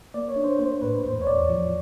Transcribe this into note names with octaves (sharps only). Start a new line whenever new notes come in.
A#3 D5
C#5
D4
C5
A#3 C5
A2 B4
E2 C5
C#5
E2 D5
F3